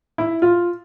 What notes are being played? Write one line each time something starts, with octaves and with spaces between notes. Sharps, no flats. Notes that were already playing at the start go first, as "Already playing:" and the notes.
E4
F4